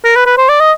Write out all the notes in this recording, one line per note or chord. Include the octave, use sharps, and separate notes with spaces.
A#4
B4
B4
C5
D5
D#5